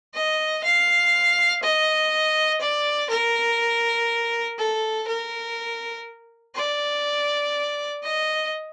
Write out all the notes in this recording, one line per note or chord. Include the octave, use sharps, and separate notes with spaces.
D#5
F5
D#5
D5
A#4
A4
A#4
D5
D#5